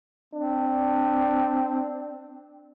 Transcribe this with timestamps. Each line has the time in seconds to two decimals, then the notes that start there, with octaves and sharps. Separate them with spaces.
0.34 C4 D4